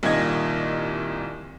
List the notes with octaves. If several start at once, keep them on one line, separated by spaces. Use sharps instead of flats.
C2 A#2 D#3 D#5 G#6 A#6